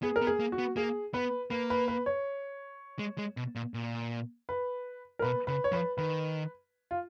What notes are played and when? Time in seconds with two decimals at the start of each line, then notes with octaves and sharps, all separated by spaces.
0.03 B3 G#4
0.16 A#4
0.22 B3
0.27 G#4
0.40 A#3
0.52 F#4
0.58 B3
0.76 A#3 G#4
1.14 B3 B4
1.50 A#3 B4
1.70 B4
1.88 B4
2.06 C#5
2.99 G#3
3.18 G#3
3.37 B2
3.55 A#2
3.74 A#2
4.49 B4
5.19 A#4
5.22 B2 B4
5.47 C#3 B4
5.64 C#5
5.72 F3 B4
5.98 D#3 B4
6.91 F4